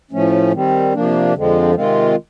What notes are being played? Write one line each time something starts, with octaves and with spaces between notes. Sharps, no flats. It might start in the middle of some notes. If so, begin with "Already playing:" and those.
A2 F3 A3 C#4
D#3 G3 C4
C3 F3 A#3 D4
F2 D3 F3 G#3 C4
C3 D#3 G#3 C4 F4